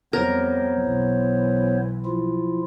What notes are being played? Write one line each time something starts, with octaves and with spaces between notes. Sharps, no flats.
F2 G3 B3 A#4 C5 C#5
B1 E3
F3 E4 F4